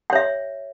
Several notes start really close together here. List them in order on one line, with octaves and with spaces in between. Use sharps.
G5 C#5 E5